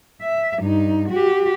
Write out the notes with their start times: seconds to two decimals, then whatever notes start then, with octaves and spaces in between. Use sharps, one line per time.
0.22 E5
0.59 G2 D#4
1.09 F#4 G4